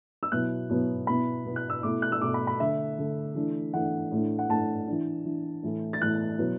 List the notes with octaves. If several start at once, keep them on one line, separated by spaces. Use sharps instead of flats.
E6
B2 F#3 B3 E4 F#6
B2 F#3 B3 E4
B2 B3 E4 B5
B2 B3 E4
F#6
E6
B2 A3 E4 D6
F#6
E6
B2 A3 E4 D6
B5
B5
D3 A3 D4 E5
D3 A3 D4
E3 A3 D4
E3 A3 D4 F#5
A2 A3 D4
F#5
A2 A3 D4 A5
E3 D4
E3 D4
A2 E3 A3 E4
A6
A2 E3 A3 E4 F#6
B2 F#3 B3 E4